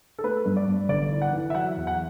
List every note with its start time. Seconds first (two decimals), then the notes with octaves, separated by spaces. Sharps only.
0.18 A4
0.24 A3 B4
0.46 G2
0.57 D5
0.68 G2
0.89 G1 D5
1.11 E3
1.22 F#5
1.33 E3
1.50 E5
1.54 F#3 F#5
1.77 E2
1.87 F#5